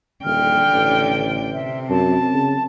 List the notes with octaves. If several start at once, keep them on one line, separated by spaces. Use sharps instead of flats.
D#1 D3 G5 F6
A1
C3 C4 E5
F#2 A5
C#3